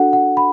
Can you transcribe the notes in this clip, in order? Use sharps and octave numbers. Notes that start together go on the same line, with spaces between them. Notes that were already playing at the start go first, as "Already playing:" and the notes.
Already playing: D4 F#4 A4 F#5
F#5
B5